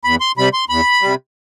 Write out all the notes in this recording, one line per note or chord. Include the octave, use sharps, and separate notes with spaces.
E2 B5
C6
C3 G3 B5
C6
E2 B5
C3 G3